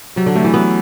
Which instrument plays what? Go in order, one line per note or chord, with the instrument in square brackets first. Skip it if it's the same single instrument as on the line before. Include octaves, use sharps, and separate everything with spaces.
[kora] C3 [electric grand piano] F#3
[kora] D3
[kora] C3 [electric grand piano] A3
[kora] E3
[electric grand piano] F#3 [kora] B3